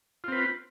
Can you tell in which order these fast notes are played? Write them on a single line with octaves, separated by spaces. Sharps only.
F4 C4 B4